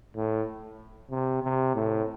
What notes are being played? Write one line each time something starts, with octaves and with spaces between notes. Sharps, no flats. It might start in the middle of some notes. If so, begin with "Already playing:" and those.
A2
C3
C3
A2